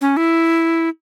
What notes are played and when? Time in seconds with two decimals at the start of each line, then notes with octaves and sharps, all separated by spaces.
0.01 C#4
0.17 E4